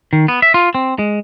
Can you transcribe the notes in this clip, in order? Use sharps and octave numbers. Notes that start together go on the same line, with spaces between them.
D#3
B3
E5
F4
C4
G#3